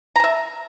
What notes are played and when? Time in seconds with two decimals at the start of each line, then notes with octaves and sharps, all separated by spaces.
0.16 A#5
0.20 A5
0.24 E5